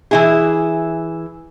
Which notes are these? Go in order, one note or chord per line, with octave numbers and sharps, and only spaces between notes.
E3 E4 G#4